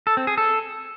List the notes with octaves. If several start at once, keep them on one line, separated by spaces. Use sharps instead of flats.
A4
C4
G#4
A4